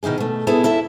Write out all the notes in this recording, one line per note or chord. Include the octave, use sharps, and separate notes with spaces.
B2 D#3 D#4 E4 G#4
B2 A3
B3 E4 G#4 A4
D#2 E4 A4 E5